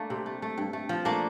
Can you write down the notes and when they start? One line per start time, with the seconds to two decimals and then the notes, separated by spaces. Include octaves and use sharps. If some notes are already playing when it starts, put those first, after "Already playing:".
Already playing: A3 A#3 D4
0.10 C3
0.26 A3
0.42 A3
0.58 G2
0.73 A3
0.89 F3
1.05 A3 A#3 D4